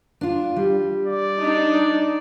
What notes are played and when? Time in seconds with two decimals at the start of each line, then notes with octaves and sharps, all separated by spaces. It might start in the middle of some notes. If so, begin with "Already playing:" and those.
0.21 D4 F4
0.56 G3
1.06 D5
1.41 D4 D#4